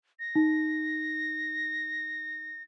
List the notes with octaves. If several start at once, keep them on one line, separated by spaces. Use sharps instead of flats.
A#6
D#4